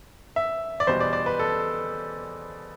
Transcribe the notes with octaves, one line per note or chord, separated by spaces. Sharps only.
E5
D5
E2 B2 G3 C5
D5
D5
B4
A4